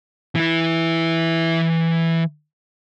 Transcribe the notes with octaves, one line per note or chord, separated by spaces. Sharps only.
E3 E4